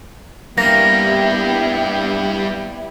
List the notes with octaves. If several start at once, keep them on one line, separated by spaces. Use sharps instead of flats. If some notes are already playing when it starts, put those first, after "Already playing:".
G2 G3 A#3 B3 E4 G4 A#6